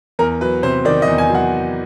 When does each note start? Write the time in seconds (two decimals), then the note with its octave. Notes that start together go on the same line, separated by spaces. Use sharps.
0.19 E2 A#4
0.41 F#3 B4
0.63 C3 C5
0.85 D#3 D5
1.02 D#5
1.08 E2
1.18 G#5
1.30 F#3
1.35 F#5